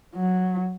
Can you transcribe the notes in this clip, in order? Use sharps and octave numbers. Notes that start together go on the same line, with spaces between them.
F#3